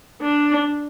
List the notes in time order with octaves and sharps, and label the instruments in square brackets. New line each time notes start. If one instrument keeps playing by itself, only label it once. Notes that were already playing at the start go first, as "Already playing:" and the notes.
[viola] D4